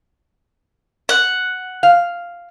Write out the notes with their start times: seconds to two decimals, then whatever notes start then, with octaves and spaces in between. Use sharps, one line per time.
1.09 F#5
1.83 F5